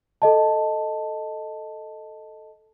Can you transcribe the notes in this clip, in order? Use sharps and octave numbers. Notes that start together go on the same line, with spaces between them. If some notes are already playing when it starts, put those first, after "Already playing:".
A4 D#5 A5